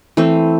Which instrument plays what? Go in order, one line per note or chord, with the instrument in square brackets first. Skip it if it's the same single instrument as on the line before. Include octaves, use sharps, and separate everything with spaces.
[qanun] E3 A3 C4